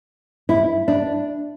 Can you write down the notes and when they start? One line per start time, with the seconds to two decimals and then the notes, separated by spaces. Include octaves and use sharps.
0.49 E4
0.88 D4